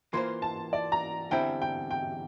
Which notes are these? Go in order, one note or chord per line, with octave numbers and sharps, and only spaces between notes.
E3 A#3 F4 C5 C6
A5
D5
A#5
E2 D3 G3 C4 E4 G5
G5
G5